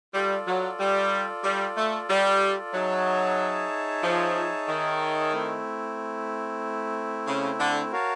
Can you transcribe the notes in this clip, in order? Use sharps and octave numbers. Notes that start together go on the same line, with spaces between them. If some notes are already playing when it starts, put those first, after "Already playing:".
G3 F4 A4 D5
F#3
G3
G3
A3
G3
F#3 D#4 G#4 C#5 E5 A5
F3
D#3
A3 C4 E4
C#3
D3
F#4 A#4 C#5 F5 A5